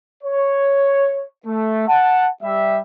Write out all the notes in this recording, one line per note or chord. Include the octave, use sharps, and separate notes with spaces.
C#5
A3
F#5 A5
G3 E5